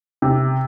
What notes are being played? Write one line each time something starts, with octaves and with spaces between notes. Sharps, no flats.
C3